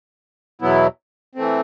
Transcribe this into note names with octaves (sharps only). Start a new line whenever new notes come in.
E2 B2 F#3 B3 E4
E3 A3 C4